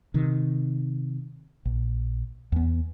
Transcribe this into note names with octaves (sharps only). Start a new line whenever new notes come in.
C3 D#3
A#1
E2 B3